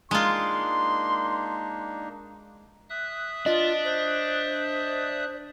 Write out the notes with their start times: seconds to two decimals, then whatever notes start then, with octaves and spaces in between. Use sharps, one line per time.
0.11 G#3 A#3 D4 D#4 F4 C6
2.90 E5 D#6 F#6
3.46 D4 F4 D#5
3.85 C5